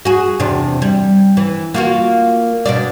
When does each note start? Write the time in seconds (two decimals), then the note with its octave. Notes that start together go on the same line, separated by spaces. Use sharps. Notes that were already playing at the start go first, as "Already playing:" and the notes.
0.05 F#4 G#4
0.40 E2 C3 D4
0.82 G3
1.37 E3
1.74 A#3 F4 F#4
2.66 B2 D4 D5